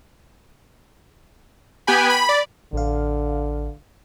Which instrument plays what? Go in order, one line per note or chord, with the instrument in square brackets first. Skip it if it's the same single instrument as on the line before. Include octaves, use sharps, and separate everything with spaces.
[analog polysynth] B3 G4 B4 G5 G#5 B5
B5
D5
[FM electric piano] A1 F5 [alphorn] D3